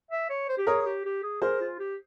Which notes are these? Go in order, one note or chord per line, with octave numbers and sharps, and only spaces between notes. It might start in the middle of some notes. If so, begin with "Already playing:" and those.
E5
C#5
C5
G4
G#4 A#4 C#5
G#4
G4
G4
G#4
G#4 A#4 C5
F4
G4